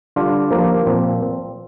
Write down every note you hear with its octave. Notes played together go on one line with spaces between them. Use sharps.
D3 G3 D4 F4
F3 A#3 G4 A#4
A#2 F3 C4